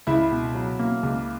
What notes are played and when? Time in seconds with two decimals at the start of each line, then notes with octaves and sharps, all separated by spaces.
0.07 C#2 E4
0.31 B2
0.54 F#3
0.79 A#3
1.03 C#2